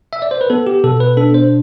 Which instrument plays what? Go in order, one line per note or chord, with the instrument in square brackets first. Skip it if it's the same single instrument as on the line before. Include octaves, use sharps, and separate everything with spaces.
[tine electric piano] E5
D5
C5
B4
B3 A4
G4
B2 A4
B4
D4 A4
C5